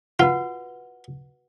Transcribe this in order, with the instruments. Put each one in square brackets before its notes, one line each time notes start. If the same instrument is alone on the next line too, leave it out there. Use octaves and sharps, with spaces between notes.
[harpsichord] F4 [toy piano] F#4 B4 F#5